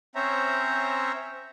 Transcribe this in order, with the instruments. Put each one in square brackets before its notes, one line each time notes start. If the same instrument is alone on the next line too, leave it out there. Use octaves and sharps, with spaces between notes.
[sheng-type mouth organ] C4 C#4 C5 C#5 E5 A#5